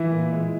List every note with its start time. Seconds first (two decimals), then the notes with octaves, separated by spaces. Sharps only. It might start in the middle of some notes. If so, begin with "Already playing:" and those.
Already playing: E3 E4
0.11 A#2
0.33 G#3